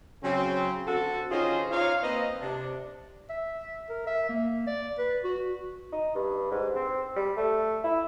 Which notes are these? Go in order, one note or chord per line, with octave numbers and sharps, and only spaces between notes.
C#3 F#3 C4
D3 C4 F#4 A4
D#3 C#4 F4 G#4 C5 D#5
D#4 F4 C#5 D5 F5
A#3 C4 B4 C5 D#5
C3 D4
E5
A#4
E5
A#3
D5
B4
F#4
D#4
G2
G#2
C4
G3
A3
E4